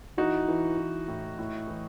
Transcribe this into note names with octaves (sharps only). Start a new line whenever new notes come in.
E3 D#4 F#4
E3
E3
A2
A2
E3